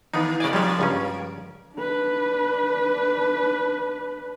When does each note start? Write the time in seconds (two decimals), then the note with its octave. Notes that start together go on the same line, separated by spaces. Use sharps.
0.14 D#3 B3 D#4
0.40 C#3 A3 F#4 D5 G#5
0.53 F3 G3 G#3 A#3 C#4
0.79 C#2 G2 C#4
1.76 D4 B4